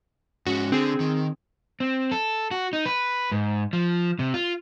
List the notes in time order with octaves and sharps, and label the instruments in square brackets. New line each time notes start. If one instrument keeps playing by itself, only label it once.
[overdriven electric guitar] G#2 C#4 [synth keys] F#4
[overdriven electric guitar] D3 [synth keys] C4 G#4
[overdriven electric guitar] D#3
C4
A4
F#4
D#4
B4
G#2
F3
C3
F4